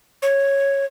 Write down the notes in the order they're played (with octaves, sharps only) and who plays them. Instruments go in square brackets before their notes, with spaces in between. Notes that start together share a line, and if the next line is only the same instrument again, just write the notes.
[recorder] C#5